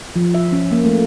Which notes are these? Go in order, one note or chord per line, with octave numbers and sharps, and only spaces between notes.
F3
E5
C#4
A#3
A3